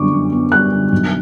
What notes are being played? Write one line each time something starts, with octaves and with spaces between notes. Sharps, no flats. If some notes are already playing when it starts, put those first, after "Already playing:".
Already playing: F#2 D3 G3 B3 C#6 D6
F#2
B3
G3 F#6
D3
B1